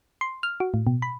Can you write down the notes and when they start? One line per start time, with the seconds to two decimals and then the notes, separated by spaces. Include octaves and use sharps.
0.21 C6
0.43 F6
0.60 F#4
0.74 A2
0.87 B2
1.02 B5